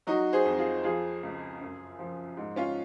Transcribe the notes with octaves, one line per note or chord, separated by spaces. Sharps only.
F#3 D#4 F#4
G#4 C5
F2
F4 G#4
F3 F4 G#4
C#2
F#2
F3
G#2
C#4 F4